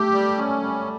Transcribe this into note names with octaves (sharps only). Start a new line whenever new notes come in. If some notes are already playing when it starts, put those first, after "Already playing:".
Already playing: A3 G4
G3
C#4
G3